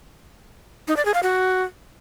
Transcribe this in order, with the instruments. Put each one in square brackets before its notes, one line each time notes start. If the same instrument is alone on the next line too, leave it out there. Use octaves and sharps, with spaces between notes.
[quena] D#4
D5
G#4
F5
F#4